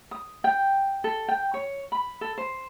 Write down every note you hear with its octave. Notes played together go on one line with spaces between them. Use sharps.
D#6
G5
A4
G5
C#5
B5
A4
C5